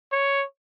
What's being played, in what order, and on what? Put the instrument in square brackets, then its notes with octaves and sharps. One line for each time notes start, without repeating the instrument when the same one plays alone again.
[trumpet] C#5